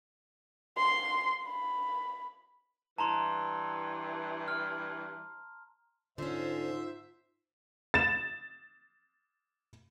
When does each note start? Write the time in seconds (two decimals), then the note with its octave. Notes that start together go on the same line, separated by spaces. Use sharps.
0.77 C6
1.44 B5
2.98 G2 E3 A5 A#5 C6
4.48 F6
6.18 G#2 D3 C#4 F4 C5 E5
7.94 A6 E7